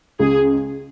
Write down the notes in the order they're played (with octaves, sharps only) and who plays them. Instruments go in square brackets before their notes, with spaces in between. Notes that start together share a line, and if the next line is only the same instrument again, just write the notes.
[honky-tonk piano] C#2 C#3 G#3 [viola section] G#4